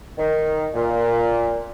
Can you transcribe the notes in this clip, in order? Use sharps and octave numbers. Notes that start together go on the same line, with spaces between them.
D#3
A#2